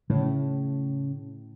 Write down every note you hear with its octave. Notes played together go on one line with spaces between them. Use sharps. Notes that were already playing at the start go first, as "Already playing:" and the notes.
A2 C#3